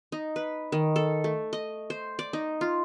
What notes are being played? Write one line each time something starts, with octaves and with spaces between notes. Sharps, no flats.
D#4
B4
D#3
A4
A3
D#5
C5
D5
D#4
F4